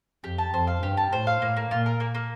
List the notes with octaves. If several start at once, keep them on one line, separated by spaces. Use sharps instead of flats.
F2 G4
A5
F2 C5
F5
G2 G4
A5
A2 C5
F5
A2 A#3
A#3
A#2 F4
A#4
A#3
A#3